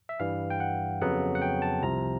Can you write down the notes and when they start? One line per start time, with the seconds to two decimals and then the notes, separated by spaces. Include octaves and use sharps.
0.09 E5
0.20 G2 E3 G3 F5
0.50 G5
0.60 F#5
1.01 F2 C#3 F#3 B3 F#5
1.35 F#5
1.42 G5
1.62 A5
1.82 C2 C3 F3 A#5